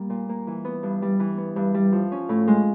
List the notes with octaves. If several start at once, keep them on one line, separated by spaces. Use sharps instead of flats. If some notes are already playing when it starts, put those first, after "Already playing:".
Already playing: G3 A#3
A#2
A#3
E3
B3
G2
G3
E3
B3
G2
G3
F3
C#4
A2
G#3